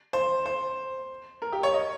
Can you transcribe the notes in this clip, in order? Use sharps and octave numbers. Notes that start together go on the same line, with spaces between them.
C5
C5
A#4
G4
C#5
D#5